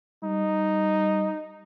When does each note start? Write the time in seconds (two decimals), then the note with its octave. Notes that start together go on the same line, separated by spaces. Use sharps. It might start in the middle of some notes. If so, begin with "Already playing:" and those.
0.24 G3 D#4